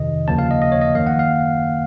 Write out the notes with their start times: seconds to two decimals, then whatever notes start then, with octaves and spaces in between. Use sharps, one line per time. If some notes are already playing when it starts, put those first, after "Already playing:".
Already playing: F2 C3 D#3 D#5
0.28 D#2 C#3 F3 A#3 A5
0.39 F5
0.51 D#5
0.62 D#5
0.72 C#5
0.81 D#5
0.95 F#2 D#3 A#3 F5
1.07 F#5
1.19 F5